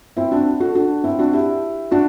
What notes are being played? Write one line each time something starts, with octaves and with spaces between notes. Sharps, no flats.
C4 E4
D4 F#4
F#4 A4
D4 F#4
C4 E4
D4 F#4
E4 G4
D4 F#4